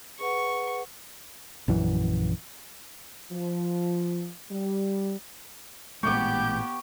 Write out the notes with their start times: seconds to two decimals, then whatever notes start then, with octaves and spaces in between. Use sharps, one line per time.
0.19 G#4 B4 F#5 C#6
1.68 A#1 F#2 E3
3.32 F3
4.51 G3
6.03 A1 A#2 G#3 B3 G4 C#6 D6 G6